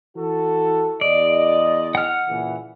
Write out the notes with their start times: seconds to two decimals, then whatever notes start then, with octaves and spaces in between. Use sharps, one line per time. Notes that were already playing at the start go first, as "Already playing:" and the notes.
0.16 E3 F#4 A4
1.01 E2 D5 D#5
1.95 F#5 F6
2.28 A#2 C#3 E3